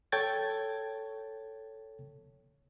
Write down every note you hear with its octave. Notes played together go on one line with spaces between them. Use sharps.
A4 C#5 G5 G#6 A6